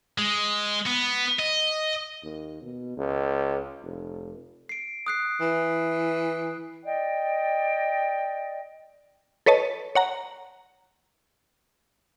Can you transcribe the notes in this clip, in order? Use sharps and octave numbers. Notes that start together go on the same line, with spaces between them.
G#3
B3
D#5
D#2
B2
C#2
F1
C7 D7
D#6 F#6 C7
E3
D5 D#5 G5
A4 B4 C#5 D#5 A5
C#5 F#5 A#5